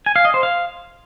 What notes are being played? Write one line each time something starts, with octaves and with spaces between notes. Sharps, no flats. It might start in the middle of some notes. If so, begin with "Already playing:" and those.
G#5
F5
D#5
C5
F5